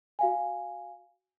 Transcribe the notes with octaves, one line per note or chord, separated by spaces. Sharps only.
F#4 F5 G#5